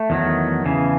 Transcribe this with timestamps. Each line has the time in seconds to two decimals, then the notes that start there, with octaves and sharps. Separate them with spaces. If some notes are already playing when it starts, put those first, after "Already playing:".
Already playing: A3
0.10 E2 D#3 F#3
0.65 E2 C#3 E3